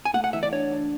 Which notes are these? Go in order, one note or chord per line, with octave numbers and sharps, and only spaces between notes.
G#5
A3 F#5
F#5
E3 E5
D5
D4 C#5
D4